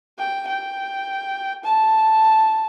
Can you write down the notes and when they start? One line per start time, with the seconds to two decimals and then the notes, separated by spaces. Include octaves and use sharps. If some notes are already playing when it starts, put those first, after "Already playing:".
0.18 G5
0.47 G5
1.64 A5